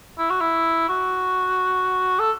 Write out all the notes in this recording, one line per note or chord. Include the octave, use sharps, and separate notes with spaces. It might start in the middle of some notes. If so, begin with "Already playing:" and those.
E4
F#4
E4
F#4
A4